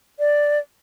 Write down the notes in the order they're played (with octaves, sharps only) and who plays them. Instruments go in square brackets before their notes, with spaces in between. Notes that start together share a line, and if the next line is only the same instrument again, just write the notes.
[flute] D5